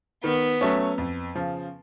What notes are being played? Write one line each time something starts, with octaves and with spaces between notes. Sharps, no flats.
D#3 B3
F#3 A3 C#4
F2
C#3 F3